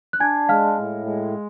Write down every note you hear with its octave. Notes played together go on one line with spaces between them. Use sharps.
F#6
D4 G#5 G#6
G#3 F5 F6
A2
G#3